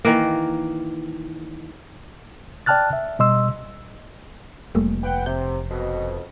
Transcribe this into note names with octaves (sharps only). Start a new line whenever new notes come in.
D#3 E3 A#3
D5 G5 A5 F6 F#6 A6
E5
B2 G3 D#5 C6 E6
F1 G3 A3 A#3
B4 F#5 G5
C3 G6
F2 B2